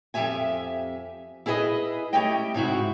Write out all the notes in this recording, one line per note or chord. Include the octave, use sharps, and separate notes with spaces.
F2 F3 G4 E5 G#5
E4 G#4 B4 D5 D#5
A3 C#4 E4 G4 D#5 G5
G#2 C3 E4 F#4